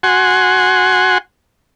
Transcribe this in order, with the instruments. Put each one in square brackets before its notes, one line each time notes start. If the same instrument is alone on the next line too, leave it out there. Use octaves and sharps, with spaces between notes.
[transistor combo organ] F#4 F#5 G#5 C6